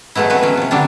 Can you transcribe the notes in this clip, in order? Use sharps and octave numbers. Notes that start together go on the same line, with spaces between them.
F#3 G#3 A3 B3 E4
B3 C4 F#4 B4
F#3 C#4
C3 F3
D3 F#3 G3 C4 D4